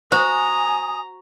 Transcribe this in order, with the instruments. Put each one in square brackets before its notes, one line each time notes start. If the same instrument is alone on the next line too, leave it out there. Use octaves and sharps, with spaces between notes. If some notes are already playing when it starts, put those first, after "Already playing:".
[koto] F#4 [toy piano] C5 [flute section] G#5 D#6 [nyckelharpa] A#5